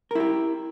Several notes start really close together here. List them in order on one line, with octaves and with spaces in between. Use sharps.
A#4 E4 G4